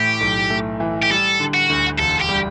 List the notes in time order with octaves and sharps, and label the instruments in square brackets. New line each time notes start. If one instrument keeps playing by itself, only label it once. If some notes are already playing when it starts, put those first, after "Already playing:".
Already playing: [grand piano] A2 E3 A3 [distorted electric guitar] G4
[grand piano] B1
A3
E3
[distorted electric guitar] G4
[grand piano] G3 [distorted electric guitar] A4
[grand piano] D3
[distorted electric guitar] F#4
[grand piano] D2
[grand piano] E1 [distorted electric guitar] A4
[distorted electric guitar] G4
[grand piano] G3